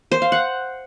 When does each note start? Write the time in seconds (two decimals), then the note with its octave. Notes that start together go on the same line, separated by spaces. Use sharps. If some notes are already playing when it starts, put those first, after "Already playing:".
0.12 C5
0.22 F5
0.32 F#5